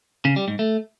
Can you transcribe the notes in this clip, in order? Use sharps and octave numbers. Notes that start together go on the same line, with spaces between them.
C#3
G3
G#2
A3